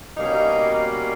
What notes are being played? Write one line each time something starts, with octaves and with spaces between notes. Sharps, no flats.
B2 G3 A#3 C#4 D#4